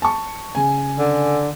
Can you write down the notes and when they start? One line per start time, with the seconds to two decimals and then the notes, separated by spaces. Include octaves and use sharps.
0.02 A5 C#6
0.55 C#3 G#5
0.99 D3